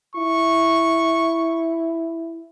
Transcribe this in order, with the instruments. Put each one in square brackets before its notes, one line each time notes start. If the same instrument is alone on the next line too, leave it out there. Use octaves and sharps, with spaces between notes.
[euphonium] E4 [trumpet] C#6